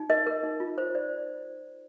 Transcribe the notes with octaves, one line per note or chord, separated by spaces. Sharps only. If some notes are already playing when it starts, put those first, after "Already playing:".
Already playing: D#4
A#4 D#5
A#4
D#4
F4
C5
C5 D5